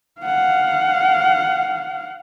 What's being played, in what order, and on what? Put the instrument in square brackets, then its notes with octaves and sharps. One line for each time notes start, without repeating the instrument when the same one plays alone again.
[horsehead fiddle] F5 F#5